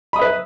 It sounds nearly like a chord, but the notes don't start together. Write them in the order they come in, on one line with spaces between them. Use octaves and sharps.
B5 D#6 E5 B4